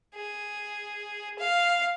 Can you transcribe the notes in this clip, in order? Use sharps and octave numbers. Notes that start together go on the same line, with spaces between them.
G#4
F5